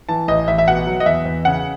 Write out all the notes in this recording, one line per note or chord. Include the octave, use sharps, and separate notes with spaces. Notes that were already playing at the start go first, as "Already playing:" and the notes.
E3 A5
A1 D#5
A1 E5
E5
B2 F#5
F#3
D#5
E2 E5
E2
C#3 F#5